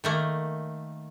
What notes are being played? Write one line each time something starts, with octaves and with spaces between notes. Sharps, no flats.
D#3 A3 A#3